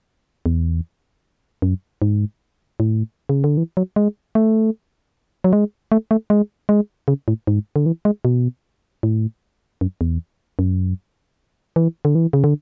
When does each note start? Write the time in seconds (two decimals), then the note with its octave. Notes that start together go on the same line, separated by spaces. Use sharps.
0.46 E2
1.62 F#2
2.02 G#2
2.80 A2
3.29 C#3
3.44 D3
3.57 E3
3.77 F#3
3.96 G#3
4.35 A3
5.44 F#3
5.53 G#3
5.92 A3
6.11 A3
6.30 G#3
6.69 G#3
7.08 C#3
7.28 A2
7.47 G#2
7.76 D3
7.86 E3
8.05 G#3
8.25 B2
9.03 A2
9.81 F#2
10.01 E2
10.59 F#2
11.76 E3
12.05 D3
12.15 E3
12.33 C#3
12.44 D3